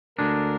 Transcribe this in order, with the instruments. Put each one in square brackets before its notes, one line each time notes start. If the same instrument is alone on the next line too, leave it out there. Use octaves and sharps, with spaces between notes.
[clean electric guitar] D2 D3 G#3 D4 [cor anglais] A#4